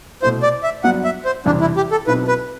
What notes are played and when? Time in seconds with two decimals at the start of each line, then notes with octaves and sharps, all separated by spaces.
0.22 C2 B2 A3 E4 C5
0.43 D5
0.63 E5
0.84 G2 F#3 B3 D4 F#5
1.04 E5
1.25 C5
1.45 E1 E2 C3 E3 G3 D4
1.61 E4
1.77 G4
1.91 A4
2.07 B1 B2 F#3 C4 E4 B4
2.28 B4